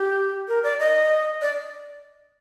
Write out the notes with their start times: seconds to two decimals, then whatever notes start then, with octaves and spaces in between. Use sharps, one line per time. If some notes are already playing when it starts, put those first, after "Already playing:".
Already playing: G4
0.48 A#4
0.63 D5
0.80 D#5
1.41 D5